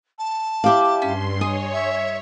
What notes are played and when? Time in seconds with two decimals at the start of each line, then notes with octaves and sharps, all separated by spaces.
0.18 A5
0.64 E4 G4 D5 F5 D6
1.02 G2 C#4 C6
1.41 C#5 D#5 G#5
1.73 E5